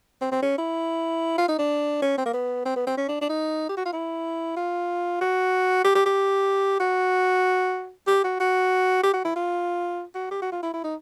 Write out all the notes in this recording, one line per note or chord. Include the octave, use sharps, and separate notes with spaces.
C4
C4
C#4
E4
F4
D#4
D4
C#4
C4
A#3
B3
C4
B3
C4
C#4
D4
D4
D#4
G4
F#4
F4
E4
F4
F#4
G4
G4
G4
F#4
G4
F#4
F#4
G4
F#4
E4
F4
F#4
G4
F#4
F4
E4
E4
D#4